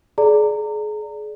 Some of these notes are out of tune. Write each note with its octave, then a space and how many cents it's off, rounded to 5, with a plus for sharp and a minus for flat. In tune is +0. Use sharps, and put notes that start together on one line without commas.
G#4 +35 D5 +0 A#5 -25